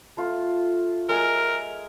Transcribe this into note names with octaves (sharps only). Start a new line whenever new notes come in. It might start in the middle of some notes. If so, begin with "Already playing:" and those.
A3 F4
G#3 A#4 E5 G#5